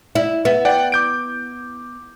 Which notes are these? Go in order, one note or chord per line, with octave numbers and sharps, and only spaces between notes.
E4
B3 E5
D5 F#5 G5
D6 G6 D7